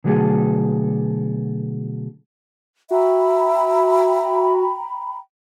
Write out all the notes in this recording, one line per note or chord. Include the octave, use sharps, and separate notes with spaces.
B2 D3 F#3 A3 G#4 A4
F#4 E5 G5 A#5 B5